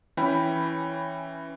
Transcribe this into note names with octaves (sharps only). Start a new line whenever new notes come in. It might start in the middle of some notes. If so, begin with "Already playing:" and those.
E3 C#4 G5 B5